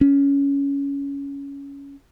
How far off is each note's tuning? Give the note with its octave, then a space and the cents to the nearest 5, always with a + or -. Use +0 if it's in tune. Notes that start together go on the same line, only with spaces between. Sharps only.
C#4 +15